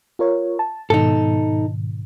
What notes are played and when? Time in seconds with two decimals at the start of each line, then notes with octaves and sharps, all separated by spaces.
0.19 F4 A#4 C#5
0.59 A5
0.90 G#2 B2 D#3 D#4 A4